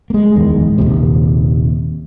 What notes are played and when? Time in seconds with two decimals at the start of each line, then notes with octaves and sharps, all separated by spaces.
0.10 G#3 A#3
0.36 D1 E2 D#3 G#3
0.78 D#1 G#1 D#2 C3